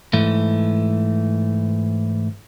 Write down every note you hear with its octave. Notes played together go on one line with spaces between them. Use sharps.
G#2 E3 A3